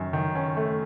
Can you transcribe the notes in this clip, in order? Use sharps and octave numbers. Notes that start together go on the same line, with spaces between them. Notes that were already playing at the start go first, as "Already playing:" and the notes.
Already playing: F#2 D#3 C#4
D#3
C#4
A3